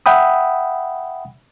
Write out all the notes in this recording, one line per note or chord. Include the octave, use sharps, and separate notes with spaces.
E5 F#5 G5 B5 D#6